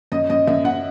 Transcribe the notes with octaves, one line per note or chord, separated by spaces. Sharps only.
F#2 D#5
F#2 D#5
F#2 E5
F#2 F#5